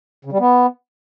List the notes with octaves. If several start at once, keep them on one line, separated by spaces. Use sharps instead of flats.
C#3
G3
B3